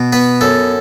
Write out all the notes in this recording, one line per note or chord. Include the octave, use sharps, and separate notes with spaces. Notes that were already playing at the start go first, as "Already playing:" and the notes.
Already playing: B2
B3 B4
F#2 A4